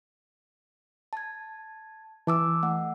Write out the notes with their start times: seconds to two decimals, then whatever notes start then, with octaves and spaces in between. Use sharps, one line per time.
1.13 A5 G#6
2.27 E3 A5 D6 E6
2.63 A3 F#5